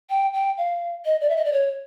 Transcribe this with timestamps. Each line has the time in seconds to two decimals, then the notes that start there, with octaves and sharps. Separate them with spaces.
0.10 G5
0.34 G5
0.58 F5
1.05 D#5
1.21 D5
1.29 E5
1.37 D#5
1.45 D5
1.52 C#5